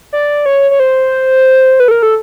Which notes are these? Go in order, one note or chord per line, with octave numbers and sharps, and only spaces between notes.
D5
C#5
C#5
C5
B4
A4
A#4
A4